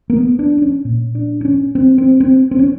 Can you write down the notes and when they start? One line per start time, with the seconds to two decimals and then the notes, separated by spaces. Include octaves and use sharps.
0.10 A#3
0.16 B3
0.39 D4
0.57 D4
0.62 C#4
0.85 A#2
1.15 D4
1.41 D4
1.45 C#4
1.75 C4
1.98 C4
2.20 C4
2.51 C4
2.59 C#4